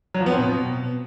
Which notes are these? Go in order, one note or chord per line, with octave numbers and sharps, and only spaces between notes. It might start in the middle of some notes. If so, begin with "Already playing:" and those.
F#3
F3
B3
C4
B2